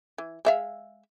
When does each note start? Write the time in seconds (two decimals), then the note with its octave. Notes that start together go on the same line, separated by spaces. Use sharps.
0.18 E3
0.45 G#3 E5 F5